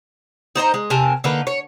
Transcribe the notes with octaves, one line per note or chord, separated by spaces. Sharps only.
D#4 C5 D#5 A#5
G#3
C3 A#4 G#5 A5
D3 A#3 D#4 B4
C#5